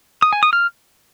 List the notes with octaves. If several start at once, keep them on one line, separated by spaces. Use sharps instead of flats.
D#6
G#5
D#6
F6